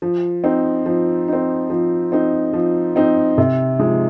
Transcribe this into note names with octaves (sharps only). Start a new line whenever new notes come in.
F3
C4 D#4
F3
C4 D#4
F3
C4 D#4
F3
C4 D#4
C3
F3 G#3 D#4